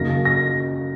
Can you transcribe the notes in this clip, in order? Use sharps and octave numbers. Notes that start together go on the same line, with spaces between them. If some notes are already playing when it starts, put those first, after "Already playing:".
Already playing: F#2 C#3 F#3 A#3 D#4 A#6
A#6